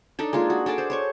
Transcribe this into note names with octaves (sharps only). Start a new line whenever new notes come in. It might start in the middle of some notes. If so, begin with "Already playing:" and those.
D4 D#4 A4
G#3 A#3 F4 G#4
F#4
D4 G#4 A4 D5
C5
C5 C#5 C#6